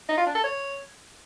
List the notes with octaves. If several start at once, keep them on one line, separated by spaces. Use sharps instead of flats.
D#4
F4
D4
A4
C#5